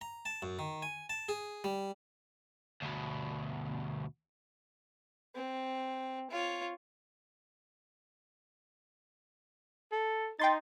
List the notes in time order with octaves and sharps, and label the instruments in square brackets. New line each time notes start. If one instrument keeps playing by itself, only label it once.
[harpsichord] A#5
A5
F#2
D#3
G#5
A5
G#4
G3
[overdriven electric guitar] D2 B2
[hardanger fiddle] C4
F4 C#5
[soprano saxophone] A4
[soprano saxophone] D#4 [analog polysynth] G5 C6 A6